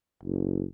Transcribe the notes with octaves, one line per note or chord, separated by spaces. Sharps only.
F#1